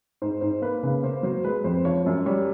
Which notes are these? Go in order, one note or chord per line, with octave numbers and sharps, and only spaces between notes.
G#2 C5
G#2 C5
A#3 B4
C#3 B4
A#3 C5
F#3 C5
G#3 B4
F2 C5
F3 C#5
F#2
G3 C#5